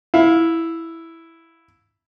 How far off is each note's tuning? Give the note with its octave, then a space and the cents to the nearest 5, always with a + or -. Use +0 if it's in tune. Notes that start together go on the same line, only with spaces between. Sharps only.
E4 +0 F5 +20